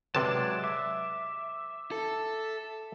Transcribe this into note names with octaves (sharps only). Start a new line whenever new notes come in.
C3 F#3 G#3 G#4 B4 D5 A5
E5 D6
A4